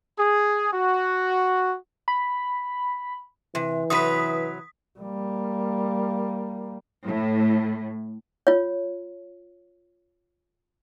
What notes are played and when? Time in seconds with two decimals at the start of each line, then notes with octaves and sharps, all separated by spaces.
0.18 G#4
0.72 F#4
2.08 B5
3.55 C3 E3
3.90 C3 F#3 B4 D#6 B6
5.00 G3 A#3
7.05 A2
8.47 F4 C#5